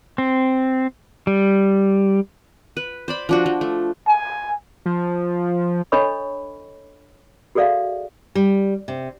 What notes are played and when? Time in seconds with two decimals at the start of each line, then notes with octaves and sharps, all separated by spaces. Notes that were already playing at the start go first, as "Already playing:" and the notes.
0.18 C4
1.27 G3
2.77 B4
3.08 C5 D5 B5
3.29 F3 D4 F#4
3.46 F3
3.61 A3
4.08 G#5
4.86 F3
5.92 D4 A4 C#5 D#5 B5 C#6
7.55 F#4 G#4 A4 D5 E5 F5
8.35 G3
8.88 C3